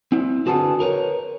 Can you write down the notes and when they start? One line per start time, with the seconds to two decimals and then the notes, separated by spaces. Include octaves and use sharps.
0.12 C4 E4
0.46 D3 F#4 G#4 B4 A5
0.80 A#4 B4 C#5